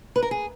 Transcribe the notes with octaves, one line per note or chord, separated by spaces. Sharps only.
B4
A#4
G#4